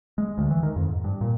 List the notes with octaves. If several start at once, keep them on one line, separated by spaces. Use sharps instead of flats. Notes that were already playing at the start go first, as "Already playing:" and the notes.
G#3
D2
E3
D#3
F2
G#2
G2
A#2